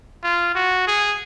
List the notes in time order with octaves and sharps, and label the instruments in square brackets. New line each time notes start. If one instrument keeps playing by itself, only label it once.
[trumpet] F4
F#4
G#4